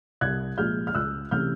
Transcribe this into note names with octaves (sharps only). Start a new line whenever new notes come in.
C2 F#6 G#6
A#2 F3 G#3 F6 G6
F6
C#2 E6 F#6
C3 E3 A3 C#4 F6 G6